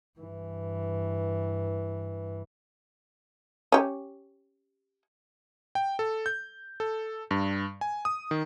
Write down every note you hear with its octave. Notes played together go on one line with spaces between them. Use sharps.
G2 E3
C#4 G4
G5
A4
G6
A4
G2
G#5
D#6
D#3